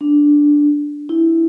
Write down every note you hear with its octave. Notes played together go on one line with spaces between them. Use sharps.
D4
E4